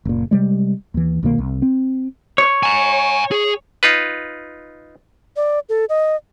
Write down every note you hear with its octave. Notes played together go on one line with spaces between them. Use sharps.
F#1 A#2
C3 G3 G#3
D#2 E3
C2 B2 D#3 A#3
C2
C4
C#5
G#5 A#5
G#4
D#4 F4 B4
D5
A4
D#5